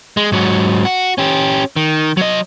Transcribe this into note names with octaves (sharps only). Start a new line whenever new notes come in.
G#3
G#2 F#3
F#4
C#4 G4
D#3
F#3 D#5